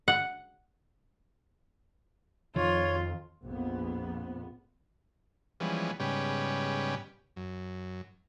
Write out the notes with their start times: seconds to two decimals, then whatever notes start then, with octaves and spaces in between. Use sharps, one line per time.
0.08 F#5
2.56 F2 D#3 F4 C#5
3.45 A#1 F2 B3
5.60 E3 F3 G3 G#3 B3 C#4
6.00 G#2 C#3 G3 B3 C#4 G4
7.36 F#2